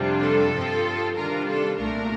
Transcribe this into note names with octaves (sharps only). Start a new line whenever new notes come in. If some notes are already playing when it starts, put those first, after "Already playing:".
Already playing: F2 C3 G3 D4 F4
A4
G2 F3 C4 F4
C3 D#3 G3 D4 F4 A#4
A4
C2 A#2 A3 D4 A#4